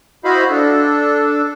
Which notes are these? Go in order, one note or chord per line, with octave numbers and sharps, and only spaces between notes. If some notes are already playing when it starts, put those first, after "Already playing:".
E4 F#4 C5 D#5 F5 B5
D4 A4